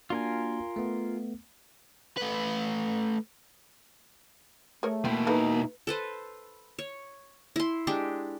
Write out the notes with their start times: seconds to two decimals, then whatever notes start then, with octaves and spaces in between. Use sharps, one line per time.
0.10 A#3 D4 F4 F#4 A#4 G#5
0.76 A3 B3
2.17 A3 B4
4.83 A3 G#4 A#4 C#5
5.05 B2 A#3 C4 E4
5.27 A3 D#4 A4 B4
5.87 A4 B4 C5
6.79 C#5
7.56 E4 C6
7.87 G#3 D4 G4